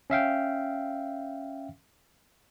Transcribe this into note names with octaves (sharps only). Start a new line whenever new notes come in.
C#4 E5 F5 G5